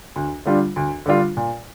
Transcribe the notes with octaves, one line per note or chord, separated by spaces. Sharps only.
D2
D3 G3 D4 F4
D2
D3 G3 D4 F4
A#2